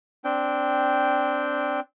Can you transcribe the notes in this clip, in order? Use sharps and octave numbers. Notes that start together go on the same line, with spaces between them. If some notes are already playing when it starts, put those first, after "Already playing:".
C4 D4 G5